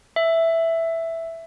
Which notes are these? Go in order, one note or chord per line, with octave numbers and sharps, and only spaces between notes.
E5